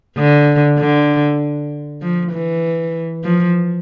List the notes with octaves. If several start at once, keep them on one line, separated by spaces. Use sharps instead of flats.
D3
D3
F3
E3
F3